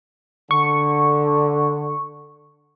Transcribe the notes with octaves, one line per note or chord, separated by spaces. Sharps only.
D3 C#6